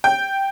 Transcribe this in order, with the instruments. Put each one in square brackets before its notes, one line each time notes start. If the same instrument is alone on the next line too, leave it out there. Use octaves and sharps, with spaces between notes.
[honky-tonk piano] G5